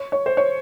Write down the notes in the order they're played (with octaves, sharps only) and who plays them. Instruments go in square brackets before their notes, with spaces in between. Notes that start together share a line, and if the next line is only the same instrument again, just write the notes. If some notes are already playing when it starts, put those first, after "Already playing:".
Already playing: [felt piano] C#5
C#5
C5
C#5